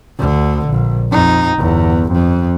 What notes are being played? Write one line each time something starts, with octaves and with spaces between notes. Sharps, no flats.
D2 D3
A#1
F2 D#4
G1 E2
F2